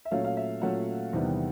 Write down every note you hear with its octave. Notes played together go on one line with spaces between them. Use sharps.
E5
A#2 F#3 A3 C#4 F5
F5
E5
A#2 F#3 A3 C#4 F#5
E2 C3 D#3 G3 B3